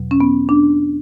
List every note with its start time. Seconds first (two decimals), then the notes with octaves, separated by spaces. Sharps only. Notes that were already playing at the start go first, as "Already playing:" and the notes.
Already playing: E2 B2 F#3
0.11 C#4
0.20 B3
0.49 D4